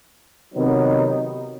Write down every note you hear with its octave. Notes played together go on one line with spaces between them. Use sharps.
C3 D#3 F#3 B3 D#4